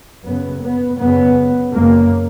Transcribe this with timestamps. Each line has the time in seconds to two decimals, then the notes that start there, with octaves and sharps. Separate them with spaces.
0.24 F#2 C#3 B3
0.62 B3
0.99 F#2 C#3 B3
1.75 F#2 C#3 A#3